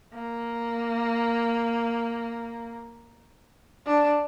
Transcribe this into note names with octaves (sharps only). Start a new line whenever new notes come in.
A#3
D4